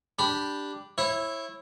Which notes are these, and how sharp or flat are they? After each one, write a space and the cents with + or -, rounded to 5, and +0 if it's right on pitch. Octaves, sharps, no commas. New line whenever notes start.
D4 +0 G4 +0 B5 +0
E4 +0 C#5 -30 E5 +0